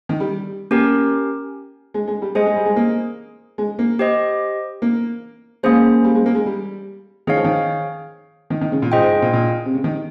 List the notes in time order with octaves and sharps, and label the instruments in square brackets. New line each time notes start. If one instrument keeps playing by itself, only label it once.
[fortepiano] D#3
G3
[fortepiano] A#3 [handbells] C#4 G4 A#4
[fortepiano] G#3
G#3
G3
[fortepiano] G#3 [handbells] G#4 C5 D#5 G#5
[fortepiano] G#3
G3
G#3
A#3
G#3
A#3
[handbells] G4 C5 D#5
[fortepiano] A#3
[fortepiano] G#3 [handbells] A#3 C#4 G#4 C5
[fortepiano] G3
G#3
A#3
G#3
G3
[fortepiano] D#3 [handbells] G#4 C#5 F5
[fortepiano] F3
D#3
D#3
D#3
C#3
A#2
[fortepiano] G#2 [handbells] F4 G#4 D#5 G5
[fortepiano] G#2
G#2
A#2
A#2
C3
C#3
D#3